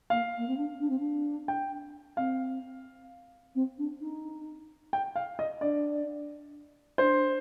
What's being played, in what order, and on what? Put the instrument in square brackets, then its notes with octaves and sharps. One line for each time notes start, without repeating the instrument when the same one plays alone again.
[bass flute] A#3 [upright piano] F5
[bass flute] A#3
C4
D4
D4
C4
D4
[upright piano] G5
[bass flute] C4 [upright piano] F5
[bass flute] C4
D4
D#4
[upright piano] G5
F5
D#5
[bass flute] D4 [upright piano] D5
[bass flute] D4 [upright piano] C5